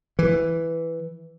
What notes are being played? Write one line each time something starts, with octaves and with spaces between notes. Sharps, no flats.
E3